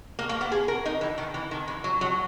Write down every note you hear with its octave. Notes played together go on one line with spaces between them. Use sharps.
A#3
A#3
B3
G#4
A#4
D#4
E3
D#3
E3
D#3
E3
F#3
F#3